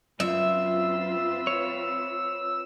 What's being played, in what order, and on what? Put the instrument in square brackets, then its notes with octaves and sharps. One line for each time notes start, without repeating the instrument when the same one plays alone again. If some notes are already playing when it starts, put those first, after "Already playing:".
[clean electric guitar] F#2 [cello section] C4 F4 B4 [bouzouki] E5 [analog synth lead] E6
[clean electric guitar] C#5